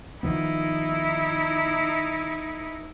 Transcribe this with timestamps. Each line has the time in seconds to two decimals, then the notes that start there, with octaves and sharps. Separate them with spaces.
0.23 D#3 F3 B3 D#4 E4